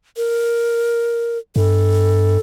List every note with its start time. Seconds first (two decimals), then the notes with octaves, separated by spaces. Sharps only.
0.17 A#4
1.56 G2 A4